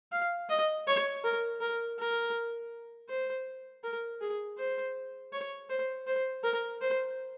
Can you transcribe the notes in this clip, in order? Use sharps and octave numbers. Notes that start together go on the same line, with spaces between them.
F5
D#5
C#5
A#4
A#4
A#4
C5
A#4
G#4
C5
C#5
C5
C5
A#4
C5